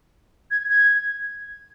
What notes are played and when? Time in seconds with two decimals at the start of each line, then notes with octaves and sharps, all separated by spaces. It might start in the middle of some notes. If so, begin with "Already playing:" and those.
0.51 G#6
0.69 G#6